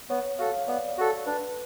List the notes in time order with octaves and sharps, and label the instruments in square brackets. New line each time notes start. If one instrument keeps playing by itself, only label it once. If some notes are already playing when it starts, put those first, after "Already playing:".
[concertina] B3 [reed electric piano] C#5
[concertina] F#4 A4 [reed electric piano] F5
[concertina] B3 [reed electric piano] D5
[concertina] F#4 A4
[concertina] D4 [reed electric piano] B4